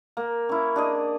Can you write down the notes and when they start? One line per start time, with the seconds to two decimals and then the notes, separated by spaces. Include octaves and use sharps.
0.17 A#3
0.49 C#4 E4
0.76 D4 G#4 D#5